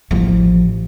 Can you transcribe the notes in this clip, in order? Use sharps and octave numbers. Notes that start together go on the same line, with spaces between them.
A1 F3